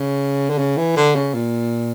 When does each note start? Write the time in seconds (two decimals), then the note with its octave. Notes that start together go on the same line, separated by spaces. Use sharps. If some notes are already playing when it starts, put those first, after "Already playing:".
Already playing: C#3
0.50 D3
0.58 C#3
0.77 E3
0.96 D3
1.15 C#3
1.34 A#2